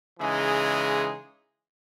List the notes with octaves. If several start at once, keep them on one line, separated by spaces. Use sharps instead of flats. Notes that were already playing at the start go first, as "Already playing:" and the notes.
C#3 E3 G#3 D#4 G#4